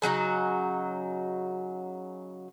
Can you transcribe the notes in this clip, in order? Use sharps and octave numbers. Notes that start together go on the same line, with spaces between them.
C#3 F#3 D#4 F#4